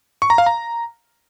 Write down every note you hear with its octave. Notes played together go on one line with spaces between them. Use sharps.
C#6
A#5
F5
A#5